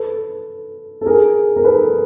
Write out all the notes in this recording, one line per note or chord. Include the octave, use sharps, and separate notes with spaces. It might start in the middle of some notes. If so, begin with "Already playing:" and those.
Already playing: A4 B4
A4
G#4 A#4
A#4
A4 B4